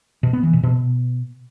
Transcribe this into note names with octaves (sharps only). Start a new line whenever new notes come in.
B2
B3
E3
B2
B2